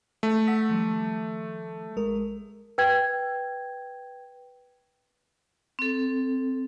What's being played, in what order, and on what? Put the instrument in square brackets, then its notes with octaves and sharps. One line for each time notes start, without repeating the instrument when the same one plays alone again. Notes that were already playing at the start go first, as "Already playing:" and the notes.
[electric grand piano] A3
[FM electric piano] F#5 E6 B6
D#3 F3 G3
A1 G#3 A#4
[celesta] B4 G5 G#6
[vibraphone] C4 A4